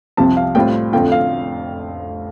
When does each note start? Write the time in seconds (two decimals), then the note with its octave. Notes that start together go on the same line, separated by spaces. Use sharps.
0.17 C2 C3 F3 C4 A5
0.37 F5
0.55 A2 G3 C4 F4 G5
0.93 F1 F2 D3 A3 F4 G5
1.12 F5